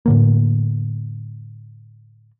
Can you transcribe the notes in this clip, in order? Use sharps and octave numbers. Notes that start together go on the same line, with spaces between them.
A2 D3 A#3